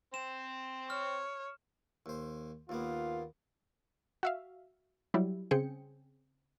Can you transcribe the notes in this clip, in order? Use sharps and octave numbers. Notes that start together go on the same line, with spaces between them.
C4 C5 E7
C#5 F6
D#2 C5
D#2 A#3 B3 F4
F#4 E5 F5
F#3 G3 E4
C#3 C4 G#4 G5 C#7